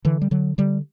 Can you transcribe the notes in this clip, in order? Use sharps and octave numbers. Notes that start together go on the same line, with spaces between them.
D3 E3
G3
D3 F#3
D3 G3